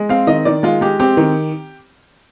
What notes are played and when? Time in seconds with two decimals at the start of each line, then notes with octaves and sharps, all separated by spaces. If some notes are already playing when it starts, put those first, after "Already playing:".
Already playing: G#3
0.09 C4 F5
0.27 D#3 D#5
0.45 D#3 D5
0.63 G#3 F4
0.81 G#3 G4
1.00 C4 G4
1.17 D#3